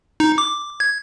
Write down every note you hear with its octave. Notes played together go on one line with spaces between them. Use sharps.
D#4
D6
G#6